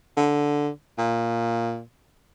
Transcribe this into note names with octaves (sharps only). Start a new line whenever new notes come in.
D3
A#2